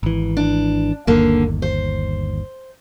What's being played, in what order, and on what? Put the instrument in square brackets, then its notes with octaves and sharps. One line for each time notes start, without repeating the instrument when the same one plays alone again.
[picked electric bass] G#1 E3
[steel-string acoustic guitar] D4
[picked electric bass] G1 D#2 [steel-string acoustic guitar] D3 A#3
[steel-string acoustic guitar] C5